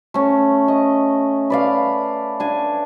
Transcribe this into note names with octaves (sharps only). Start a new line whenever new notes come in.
A3 C#4
D#5
B4 D5 F5
D4 G#5